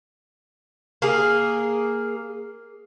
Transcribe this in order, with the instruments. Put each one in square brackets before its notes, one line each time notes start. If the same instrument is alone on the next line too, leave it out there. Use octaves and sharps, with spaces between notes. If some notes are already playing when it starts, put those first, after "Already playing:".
[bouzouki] A#3 G#4